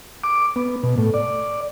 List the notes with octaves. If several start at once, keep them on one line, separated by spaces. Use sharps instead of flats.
D6
B3
B2
A2
D5